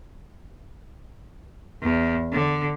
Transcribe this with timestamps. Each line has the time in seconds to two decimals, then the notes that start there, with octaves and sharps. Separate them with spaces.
1.82 E2
2.32 D3